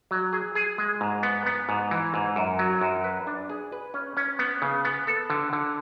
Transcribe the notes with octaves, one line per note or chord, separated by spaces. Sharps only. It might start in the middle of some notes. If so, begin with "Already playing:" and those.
F#3
G#4
G#4
G#3
G#2
B3
B3
G#2
E3
G#2
F#2
F#3
F#2
B4
D4
G#4
B4
C#4
C#4
B3
C#3
B3
A4
D3
D3